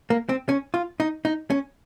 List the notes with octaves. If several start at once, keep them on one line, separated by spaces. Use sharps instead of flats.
A#3
C4
C#4
F4
D#4
D#4
C#4